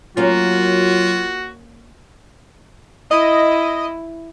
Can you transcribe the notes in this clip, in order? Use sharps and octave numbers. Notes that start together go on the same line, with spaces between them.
F#3 A#3 C#4 F4 F#4
E4 D#5